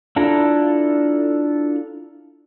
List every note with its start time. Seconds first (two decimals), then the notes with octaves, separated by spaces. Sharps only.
0.16 D4 E4 F4 A4 A#5